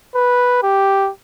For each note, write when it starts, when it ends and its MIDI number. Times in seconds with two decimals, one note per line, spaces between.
0.15 0.59 71
0.63 1.10 67